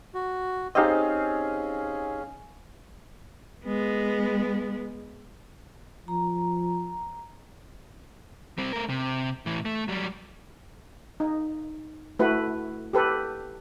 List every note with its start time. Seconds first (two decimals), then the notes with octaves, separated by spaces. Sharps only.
0.14 F#4
0.75 C4 C#4 D#4 G4 G#4 D#5 F5
3.65 G#3 B3
6.08 F3 A#5
8.58 G3 C4
8.73 A3 A#4
8.89 C3
9.46 A2 E3
9.65 A3
9.88 F#3 G3
11.20 D#4
12.19 A3 E4 F#4 B4
12.93 G4 A4 B4